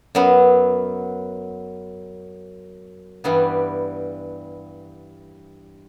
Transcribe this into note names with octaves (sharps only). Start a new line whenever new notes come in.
F#2 F#3 B3
G2 E3 G3 B3